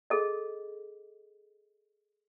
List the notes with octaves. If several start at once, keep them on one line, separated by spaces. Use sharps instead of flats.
G#4 A4 D#5